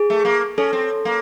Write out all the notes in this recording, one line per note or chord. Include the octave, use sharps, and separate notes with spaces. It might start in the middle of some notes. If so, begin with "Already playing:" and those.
Already playing: G#4
A3
A#3
C#4 A4
C4
A#3